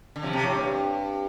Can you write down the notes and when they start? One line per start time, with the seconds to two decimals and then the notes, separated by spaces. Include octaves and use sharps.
0.16 D3
0.23 C3 F3
0.33 C3
0.44 A2
0.55 G2